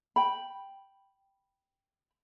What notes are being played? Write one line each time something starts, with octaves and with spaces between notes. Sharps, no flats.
G5 B5